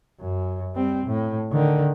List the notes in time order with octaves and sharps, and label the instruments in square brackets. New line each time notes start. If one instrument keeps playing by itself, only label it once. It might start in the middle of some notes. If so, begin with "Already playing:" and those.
[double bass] F#2
G3 C4
A2
D3 D#3